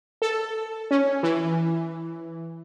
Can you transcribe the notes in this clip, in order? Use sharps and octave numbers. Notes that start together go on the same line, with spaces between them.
A4
C#4
E3